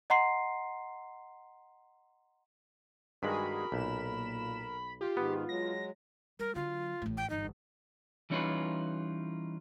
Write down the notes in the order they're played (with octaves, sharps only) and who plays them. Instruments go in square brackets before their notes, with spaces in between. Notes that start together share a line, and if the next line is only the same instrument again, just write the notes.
[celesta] D#5 F#5 A#5 C6 C7
[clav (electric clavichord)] G2 D#3 G#3 [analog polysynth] F#4 G#4 [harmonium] A#4 [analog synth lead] B5
[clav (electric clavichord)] B1 [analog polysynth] A#2 E7
[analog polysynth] F4 [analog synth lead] G4
[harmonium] G#2 D#3 [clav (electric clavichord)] B3
[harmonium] F#3 G#3 [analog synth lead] A#6
[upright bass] G3 [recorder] A#4
[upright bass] D3 F#3 [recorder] F4
[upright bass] A1 A2
[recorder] G5
[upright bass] G1 E2 [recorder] D#4
[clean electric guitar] E3 G3 C#4 D#4 F4 B4